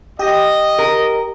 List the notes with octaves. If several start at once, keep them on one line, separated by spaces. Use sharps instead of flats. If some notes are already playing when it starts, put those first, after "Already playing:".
G4 D#5
A#4